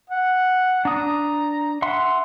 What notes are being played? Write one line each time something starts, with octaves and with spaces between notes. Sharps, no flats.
F#5
D4 A#5 D#6
E5 F#5 C6